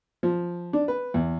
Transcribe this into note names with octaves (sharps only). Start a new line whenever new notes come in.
F3
D4
B4
E2